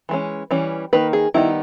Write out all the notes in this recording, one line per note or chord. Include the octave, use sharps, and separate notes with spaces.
E3 G#3 C#4
E3 G3 C#4
D#3 A#3 D#4 B4
G#4
D#3 G3 B3 D#4 E4